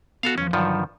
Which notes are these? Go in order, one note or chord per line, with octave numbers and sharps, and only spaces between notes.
B3 F#4 A4 F5
E2 F3 C#4
G2 D3 D#3 F3 F#3 F#5